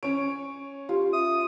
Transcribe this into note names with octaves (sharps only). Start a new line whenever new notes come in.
C#4 C#5 C#6 D7
F4 G4
E5 D#6